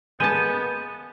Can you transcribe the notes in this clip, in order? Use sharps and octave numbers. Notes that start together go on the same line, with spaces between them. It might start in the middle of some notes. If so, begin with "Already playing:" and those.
G#3 A#3 B3 A5 G6 D#7